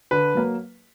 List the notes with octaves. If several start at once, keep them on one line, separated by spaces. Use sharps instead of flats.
D3 B4
F#3 A#3